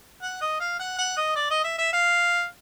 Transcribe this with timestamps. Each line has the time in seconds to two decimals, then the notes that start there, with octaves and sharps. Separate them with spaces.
0.22 F#5
0.41 D#5
0.60 F5
0.79 F#5
0.99 F#5
1.17 D#5
1.35 D5
1.50 D#5
1.64 E5
1.78 E5
1.93 F5